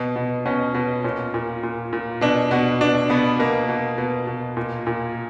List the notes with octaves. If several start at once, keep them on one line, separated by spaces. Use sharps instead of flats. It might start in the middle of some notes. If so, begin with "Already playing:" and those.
Already playing: B2
B2
B2 C#4
B2
A#2 C#4
A#2
A#2
A#2
B2 D4
B2 F#4
B2 D4
B2 B3
B2 A#3
B2
B2
B2
A#2
A#2